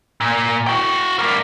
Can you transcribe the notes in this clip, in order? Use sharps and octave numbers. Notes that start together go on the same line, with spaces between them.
A#2
F#4 G5
G3 A#4